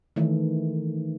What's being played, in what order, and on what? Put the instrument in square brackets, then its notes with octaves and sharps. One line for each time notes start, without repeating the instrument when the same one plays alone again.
[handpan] D#3 E3 A3